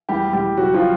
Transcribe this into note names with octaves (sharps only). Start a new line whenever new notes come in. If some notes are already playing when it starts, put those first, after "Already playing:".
E2 G3 G4
E2 G3 G4
C#3 F#3 F#4
F3 F4